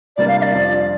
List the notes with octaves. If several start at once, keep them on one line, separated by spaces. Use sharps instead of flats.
C3 G3 A#3 D4 D5
F5
F5
D5
F2 F3 D4